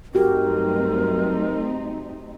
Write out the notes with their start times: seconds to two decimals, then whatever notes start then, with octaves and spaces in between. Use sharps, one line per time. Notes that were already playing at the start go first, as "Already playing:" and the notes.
0.15 G2 F#3 A3 C4 D#4 F#4 G4 A#4